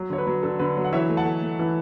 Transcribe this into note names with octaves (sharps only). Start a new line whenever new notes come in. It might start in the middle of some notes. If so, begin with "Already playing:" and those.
Already playing: F#3
D3 C#5
B4
F#3
D3 A4
D3 B4
F#3
F#5
E3 C#5 E5
A3
F#5 A5
A3
A3
E3